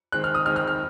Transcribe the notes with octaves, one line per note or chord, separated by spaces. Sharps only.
D#3 G#3 C4 F#6
F6
D#6
D#3 G#3 C4 F6
F6
F6